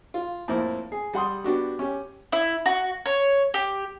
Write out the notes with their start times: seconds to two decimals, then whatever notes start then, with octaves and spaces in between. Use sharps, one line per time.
0.14 F4
0.48 F2 A2 A#3 C4 E4
0.92 G#4
1.14 G3 F#5 C6 D#6
1.44 B3 D4 F#4 G4
1.79 C#4 G4
2.32 E4
2.66 F#4
3.06 C#5
3.54 G4